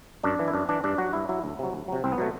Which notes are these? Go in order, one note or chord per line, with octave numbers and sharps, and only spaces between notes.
F#2 D4
E3
E4
F#2 D4
E3 D4
G2 D4
F#3 F#4
G2 E4
F#3 E4
D2
C3 F#3
D2
C3 F#3
C2 C4
B3
B2 F#3 A3